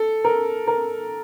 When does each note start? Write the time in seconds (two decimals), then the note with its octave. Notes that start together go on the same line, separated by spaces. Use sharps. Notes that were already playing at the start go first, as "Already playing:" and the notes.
Already playing: A4
0.24 A#4
0.67 A#4